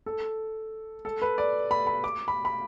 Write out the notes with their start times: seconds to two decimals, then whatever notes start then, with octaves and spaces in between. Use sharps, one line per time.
0.06 A4
1.05 A4
1.22 B4
1.38 D5
1.71 B5
1.87 B5
2.04 D6
2.28 B5
2.45 B5